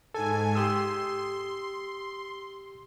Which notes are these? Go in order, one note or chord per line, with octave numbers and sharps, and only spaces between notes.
G#2 A4 G#5
G4 C6 D#6 E6